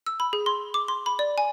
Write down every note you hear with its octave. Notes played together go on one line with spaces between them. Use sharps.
E6
B5
G#4
C6
D6
C6
B5
D5
G#5